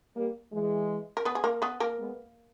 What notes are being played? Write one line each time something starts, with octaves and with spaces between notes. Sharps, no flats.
G3 A#3
E3 G#3
A#4
B3 B4
G#4
A#3 A#4
B3 B4
A#3 A#4
G#3 B3